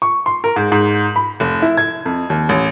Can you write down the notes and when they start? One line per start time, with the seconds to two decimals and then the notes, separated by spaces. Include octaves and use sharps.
0.02 C#6
0.26 C6
0.44 A#4
0.56 G#2
0.72 G#2
1.16 B5
1.40 F1
1.62 E4
1.77 G#6
2.06 F2
2.30 D#2
2.49 A1